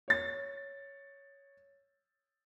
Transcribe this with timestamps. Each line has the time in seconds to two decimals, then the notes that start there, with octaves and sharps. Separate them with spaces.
0.08 C#5 A6